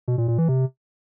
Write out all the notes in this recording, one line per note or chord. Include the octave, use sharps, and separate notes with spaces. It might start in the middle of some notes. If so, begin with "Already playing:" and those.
B2
A#2
A#2
E3
C3